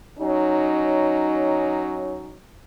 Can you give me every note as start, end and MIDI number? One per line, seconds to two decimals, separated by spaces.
0.19 2.36 54
0.19 2.36 61
0.19 2.36 63